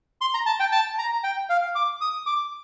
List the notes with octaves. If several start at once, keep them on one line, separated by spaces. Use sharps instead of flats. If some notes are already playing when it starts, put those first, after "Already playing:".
C6
A#5
A5
G5
A5
A#5
G5
F5
D6
D#6
D6